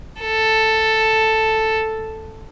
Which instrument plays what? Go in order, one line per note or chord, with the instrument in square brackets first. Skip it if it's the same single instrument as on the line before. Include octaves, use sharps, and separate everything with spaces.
[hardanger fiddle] A4